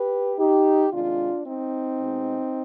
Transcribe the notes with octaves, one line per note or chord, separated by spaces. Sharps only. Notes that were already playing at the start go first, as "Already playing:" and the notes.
Already playing: G4 B4
D#4 G4
C3 D#3 G#3 D4 F4
C4 D#4
B2 G#3